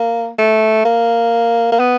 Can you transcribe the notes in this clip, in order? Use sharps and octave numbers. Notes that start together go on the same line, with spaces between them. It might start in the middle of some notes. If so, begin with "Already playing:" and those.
Already playing: A#3
A3
A#3
A#3
B3